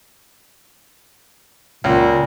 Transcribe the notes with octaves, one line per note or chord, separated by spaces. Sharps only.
C#2 A#2